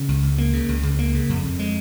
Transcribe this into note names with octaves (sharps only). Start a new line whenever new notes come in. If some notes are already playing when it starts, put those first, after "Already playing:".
Already playing: C#3
C#2
C#2
A#3
C#3
C#2
C#2
A#3
C#3
F2
F2
G#3